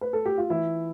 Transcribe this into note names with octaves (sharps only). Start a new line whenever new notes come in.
B4
A4
G4
F4
E3 E4